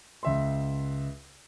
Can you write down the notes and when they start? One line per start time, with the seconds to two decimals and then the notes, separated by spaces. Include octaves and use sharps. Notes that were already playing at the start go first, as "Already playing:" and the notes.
0.23 C#2 E5 C6